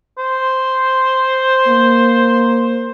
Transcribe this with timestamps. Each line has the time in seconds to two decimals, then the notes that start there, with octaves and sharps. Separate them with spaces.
0.18 C5
1.67 A#3